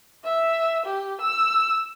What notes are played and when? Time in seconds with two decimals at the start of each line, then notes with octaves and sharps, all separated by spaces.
0.25 E5
0.85 G4
1.21 E6